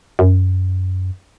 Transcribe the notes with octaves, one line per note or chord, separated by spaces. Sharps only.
F#2